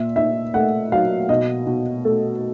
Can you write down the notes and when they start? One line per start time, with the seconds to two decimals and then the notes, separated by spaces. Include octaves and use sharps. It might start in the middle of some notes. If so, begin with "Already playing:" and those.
Already playing: A#2 E5
0.16 A#2 E5
0.54 A3 F#5
0.92 F#3 F5
1.29 B2 D#5
1.67 B2
2.05 A3 A4